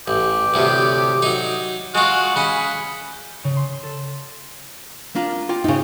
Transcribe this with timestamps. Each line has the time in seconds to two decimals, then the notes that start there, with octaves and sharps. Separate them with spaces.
0.08 A1 G4
0.54 D2 A2 C3
1.22 F#3 D#4
1.95 G#3 F4 F#4
2.36 C#3 C#4 B5
3.13 G6
3.44 C#3
3.57 C6
3.83 A4
5.15 A#3 D4 F4
5.49 F4 D5 G5
5.64 C#3 D#4